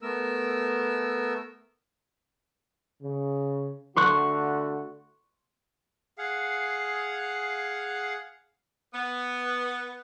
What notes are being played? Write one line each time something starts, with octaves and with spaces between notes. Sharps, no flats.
A3 B3 A#4 E6
C#3
D3 A3 F#4 C6 C#6 F#6
G#4 F5 F#5
B3